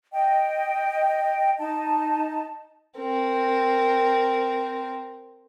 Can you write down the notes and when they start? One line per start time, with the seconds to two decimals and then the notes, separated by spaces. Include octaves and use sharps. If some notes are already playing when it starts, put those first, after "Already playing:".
0.13 D#5 G5
1.59 D#4 A5
2.98 C4 A#4